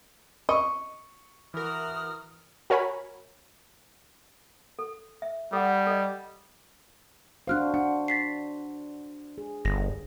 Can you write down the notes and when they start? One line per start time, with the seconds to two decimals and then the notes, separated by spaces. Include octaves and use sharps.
0.49 D#5 C#6
1.54 E3 F#4 A#4 D#6 F6
2.70 F#4 A#4 C#5 G#5 B5
4.79 A4
5.22 E5
5.53 G3 A4 F#5
5.87 A4 D#5
7.47 D4 F#4 C5 F5 F6 F#6
7.74 D4 F#5
8.08 A6 B6 C7
9.38 G#4
9.65 G1 A#6